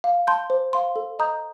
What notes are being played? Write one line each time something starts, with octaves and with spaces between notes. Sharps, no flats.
F5
A5 C6 G6
C5
F5 C6
A4
D#5 A#5 D#6 G6